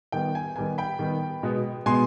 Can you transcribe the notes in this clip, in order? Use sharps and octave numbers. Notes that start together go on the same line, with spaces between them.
D#3 G3 B3 G5
G#5
D#3 G3 B3 G#5
G5 B5
D#3 G3 B3
B2 G#3 B3
B2 G#3 B3 G#5 C6